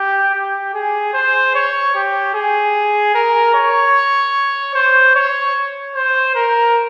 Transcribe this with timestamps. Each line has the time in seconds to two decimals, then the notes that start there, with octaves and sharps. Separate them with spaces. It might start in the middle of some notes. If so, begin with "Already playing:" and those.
Already playing: G4
0.34 G4
0.74 G#4
1.14 C5
1.55 C#5
1.95 G4
2.34 G#4
3.14 A#4
3.54 C#5
4.75 C5
5.15 C#5
5.95 C5
6.35 A#4